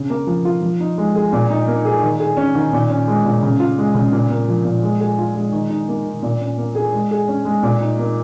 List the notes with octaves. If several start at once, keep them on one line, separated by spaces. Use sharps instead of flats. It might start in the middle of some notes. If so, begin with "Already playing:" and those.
Already playing: C#3
A#3
F3
F4
F3
D#4
G#3
G#4
A#2
D#4
A#3
G#4
D#3
G#4
C#4
D#3
A#2
C#4
G#3
A#2
C#3
F4
G#3
C#3
A#2
A#3
F3
A#2
G#3
G#4
F4
G#3
D#3
D#4
A#3
D#3
A#2
C#4
A#3
G#4
G#3
G#4
C#4
G#3
A#2
D#4
A#3